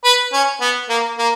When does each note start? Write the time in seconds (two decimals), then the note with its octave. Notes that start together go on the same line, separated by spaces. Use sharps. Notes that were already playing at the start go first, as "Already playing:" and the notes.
0.04 B4
0.33 C#4
0.61 B3
0.89 A#3
1.19 A#3